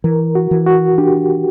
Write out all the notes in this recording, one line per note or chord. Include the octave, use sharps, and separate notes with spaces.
E3 A#4
F#4
E3
F#4
D4 G4